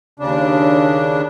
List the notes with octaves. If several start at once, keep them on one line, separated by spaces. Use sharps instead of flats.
D#2 C#3 D4